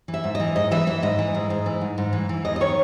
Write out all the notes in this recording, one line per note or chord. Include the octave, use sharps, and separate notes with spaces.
E3
E5
G#2
E3 D#5
G#2 D#5
E3 E5
E3 E5
G#2 D#5
E3
G#2
G#2
E3
G#2
G#2
E3
E3
E2 D#5
D#5
D#3 C#5